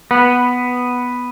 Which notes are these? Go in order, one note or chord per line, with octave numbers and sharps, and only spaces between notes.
B3